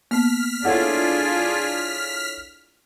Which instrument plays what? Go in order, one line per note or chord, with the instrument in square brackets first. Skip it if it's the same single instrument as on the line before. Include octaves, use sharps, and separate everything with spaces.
[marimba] A#3 B3 [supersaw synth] F6 B6
[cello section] D4 F4 G#4 [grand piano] E4 A4 C#5 [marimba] F#5